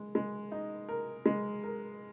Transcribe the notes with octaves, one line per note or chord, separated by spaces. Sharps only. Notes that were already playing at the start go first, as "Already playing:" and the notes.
Already playing: G#3
G#3
D#4
A#4
G#3
A#4